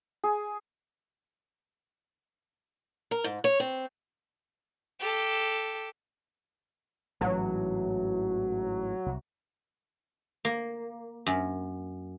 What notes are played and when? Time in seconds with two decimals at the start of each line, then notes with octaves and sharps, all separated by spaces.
0.24 G#4
3.11 A#4
3.24 G#2
3.44 C#5
3.60 C4
5.00 G4 A4
7.21 A1 G#2 E3 F#3
9.06 C2
10.45 A#3
11.26 F#2